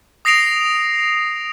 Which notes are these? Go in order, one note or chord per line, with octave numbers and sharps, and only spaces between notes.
D#6 A#6 C7 D7 F7